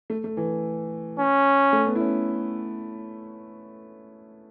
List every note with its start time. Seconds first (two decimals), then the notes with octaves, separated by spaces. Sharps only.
0.10 A3
0.24 A3
0.37 E3
1.19 C#4
1.73 A3
1.87 B3
1.95 E4
2.00 C#4